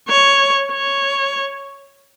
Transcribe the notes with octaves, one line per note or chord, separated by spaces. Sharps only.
C#5
C#5